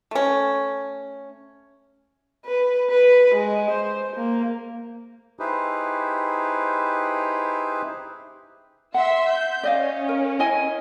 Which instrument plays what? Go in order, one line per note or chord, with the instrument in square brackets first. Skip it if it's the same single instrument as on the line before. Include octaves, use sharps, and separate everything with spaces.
[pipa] A3 C#4
[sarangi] B4
B4
G#3
C5
A#3
[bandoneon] D#4 E4 G4 G#4 B4 C5
[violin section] E5 C6 [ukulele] F#5
[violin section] G6
[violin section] C#4 [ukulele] D5 D#5 F5
[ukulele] A#4
E4 D#5 G#5